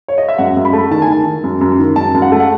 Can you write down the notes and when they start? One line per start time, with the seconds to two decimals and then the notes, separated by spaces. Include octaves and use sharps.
0.08 C#5
0.18 D#5
0.28 E5
0.38 F#2 F#5
0.57 F#2
0.65 B5
0.73 A3
0.91 D#3 A5
1.02 G#5
1.08 D#3 A5
1.26 D#3
1.44 F#2
1.61 F#2
1.79 D#3
1.96 F#2 A5
2.14 F#2
2.22 F#5
2.32 A3
2.40 F#5